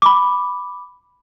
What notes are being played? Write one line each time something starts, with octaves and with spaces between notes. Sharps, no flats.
B5 D6